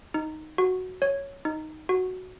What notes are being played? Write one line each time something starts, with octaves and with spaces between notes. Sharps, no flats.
D#4
F#4
C#5
D#4
F#4